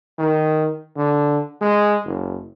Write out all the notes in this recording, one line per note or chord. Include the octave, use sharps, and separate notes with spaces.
D#3
D3
G#3
F#1